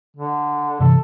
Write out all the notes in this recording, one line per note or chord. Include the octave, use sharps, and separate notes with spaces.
D3
G2 C3 E3 A4